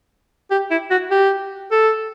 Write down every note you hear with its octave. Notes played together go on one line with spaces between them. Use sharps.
G4
E4
F#4
G4
A4